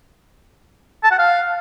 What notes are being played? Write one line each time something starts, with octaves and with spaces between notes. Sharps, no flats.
A5
F#5
F5